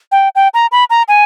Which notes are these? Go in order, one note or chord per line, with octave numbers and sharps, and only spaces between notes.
G5
G5
A#5
B5
A#5
G#5